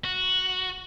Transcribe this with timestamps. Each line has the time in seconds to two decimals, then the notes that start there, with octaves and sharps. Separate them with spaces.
0.04 F#4